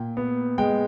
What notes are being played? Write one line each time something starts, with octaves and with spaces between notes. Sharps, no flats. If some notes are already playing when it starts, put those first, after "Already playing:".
Already playing: A#2 G5
B3
G#3 G5